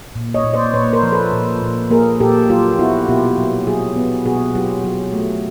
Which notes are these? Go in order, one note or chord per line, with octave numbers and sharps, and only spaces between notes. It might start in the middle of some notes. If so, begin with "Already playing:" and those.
A#2
C#5 D#5
A#2
C5 D5
A#2 B4 C#5
A#4 C5
F3
A4 B4
A#2
A#2
A#3 G#4 A#4
A#2 G4 A4
F#3 F4 G4
B3 E4 F#4
B2 F4 G4
F#3
F#3 F#4 G#4
B3
B2 F#4 G#4
F#3 F4 G4
F#3
A3